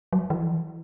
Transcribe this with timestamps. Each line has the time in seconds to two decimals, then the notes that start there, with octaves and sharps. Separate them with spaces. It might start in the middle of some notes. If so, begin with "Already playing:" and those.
0.13 F#3
0.30 E3